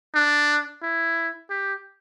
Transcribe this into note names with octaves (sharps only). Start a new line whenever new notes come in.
D4
E4
G4